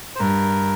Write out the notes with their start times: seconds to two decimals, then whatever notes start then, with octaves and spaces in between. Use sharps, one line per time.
0.15 C5
0.19 G2 A#4